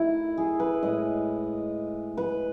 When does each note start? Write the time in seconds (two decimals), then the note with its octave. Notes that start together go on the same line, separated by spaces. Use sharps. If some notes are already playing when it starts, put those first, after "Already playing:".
Already playing: D#3 A3 E4
0.38 G#4
0.60 B4
0.82 A2 G#3 D#5
2.17 B4